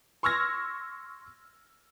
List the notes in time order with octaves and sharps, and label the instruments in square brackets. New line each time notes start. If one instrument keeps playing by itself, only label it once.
[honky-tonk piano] C6 C#6 E6 F6 G#6 A#6